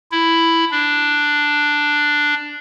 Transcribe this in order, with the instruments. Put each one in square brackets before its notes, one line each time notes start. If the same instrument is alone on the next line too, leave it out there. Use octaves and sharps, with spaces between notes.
[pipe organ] E4
D4